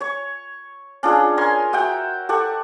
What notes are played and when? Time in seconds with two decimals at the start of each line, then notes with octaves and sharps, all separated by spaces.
0.01 C#5 C#6
1.03 C#4 D4 F4 G#4
1.37 A#4 C#5 G#5 C6
1.73 F#4 E5 F#5 G5
2.29 G4 A4 F#5 C#6